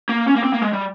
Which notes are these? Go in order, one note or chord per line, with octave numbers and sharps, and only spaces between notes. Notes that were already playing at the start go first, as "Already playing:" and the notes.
A#3
C#4
A#3
C4
A#3
G#3
G3